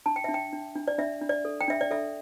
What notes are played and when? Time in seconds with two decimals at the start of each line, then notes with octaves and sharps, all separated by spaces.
0.06 D4 A5
0.16 G5
0.24 E5
0.29 D4
0.34 G5
0.53 D4
0.75 D4
0.88 D5
0.98 D4 E5
1.21 D4
1.29 D5
1.45 A4
1.61 G5
1.68 D4 E5
1.81 D5
1.91 A4 E5